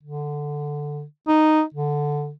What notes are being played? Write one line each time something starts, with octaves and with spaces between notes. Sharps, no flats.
D3
D#4
D3